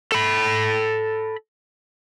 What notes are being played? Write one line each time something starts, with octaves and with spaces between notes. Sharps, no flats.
A4 B5